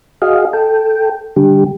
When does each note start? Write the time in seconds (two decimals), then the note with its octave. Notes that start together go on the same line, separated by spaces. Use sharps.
0.22 F#4 G#4 D#5 F5
0.53 A4 G5
1.36 D3 G3 G4